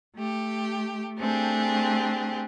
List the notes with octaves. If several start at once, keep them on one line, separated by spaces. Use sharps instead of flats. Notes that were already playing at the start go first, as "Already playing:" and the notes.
A3 G4
A3 C4 D4 G4 G#4